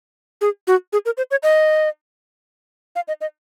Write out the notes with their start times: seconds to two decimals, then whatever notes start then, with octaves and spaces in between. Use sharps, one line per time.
0.41 G#4
0.67 F#4
0.93 G#4
1.05 A#4
1.17 C5
1.31 C#5
1.43 D#5
2.96 F5
3.08 D#5
3.21 D#5